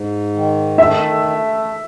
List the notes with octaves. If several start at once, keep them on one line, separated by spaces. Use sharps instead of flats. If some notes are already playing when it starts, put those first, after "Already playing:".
Already playing: G#2
D#3
A3 E5